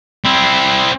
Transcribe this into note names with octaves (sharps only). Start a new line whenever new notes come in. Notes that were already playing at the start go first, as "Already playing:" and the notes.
C4 E4